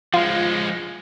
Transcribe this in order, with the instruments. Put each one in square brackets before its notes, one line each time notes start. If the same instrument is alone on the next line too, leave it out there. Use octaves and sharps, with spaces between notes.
[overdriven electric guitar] F3 G#3 [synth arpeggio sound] F4